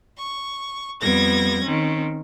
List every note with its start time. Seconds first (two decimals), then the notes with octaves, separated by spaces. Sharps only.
0.17 C#6
1.00 F2 G3 B3 G#6 A#6
1.64 D#3 C4 C#4